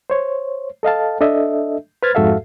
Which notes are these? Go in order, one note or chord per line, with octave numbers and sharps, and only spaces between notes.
C5 C#5
A4 D#5 F5 A5
D4 A4 D#5 E5
B4 C5 B5 F6 G#6 A6
F2 G#2 F#4 A4 E5 F5